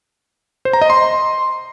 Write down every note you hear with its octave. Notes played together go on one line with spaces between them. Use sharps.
C5
A#5
D#5
C6